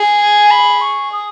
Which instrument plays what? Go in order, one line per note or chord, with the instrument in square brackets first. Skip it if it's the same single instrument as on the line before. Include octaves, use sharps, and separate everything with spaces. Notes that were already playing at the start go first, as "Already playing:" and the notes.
Already playing: [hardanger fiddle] G#4
[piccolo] G#5
B5
C#6
D#6